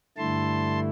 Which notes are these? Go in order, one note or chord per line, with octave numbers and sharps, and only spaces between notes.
G2 D3 A3 E4 A5 C6